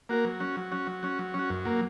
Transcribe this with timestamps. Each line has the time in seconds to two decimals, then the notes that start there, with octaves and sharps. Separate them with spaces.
0.09 A#3 F#4 A#4
0.25 F#3
0.40 C#4 F#4
0.57 F#3
0.72 C#4 F#4
0.87 F#3
1.03 C#4 F#4
1.19 F#3
1.34 C#4
1.39 F#4
1.50 F#2
1.65 F#3 A#3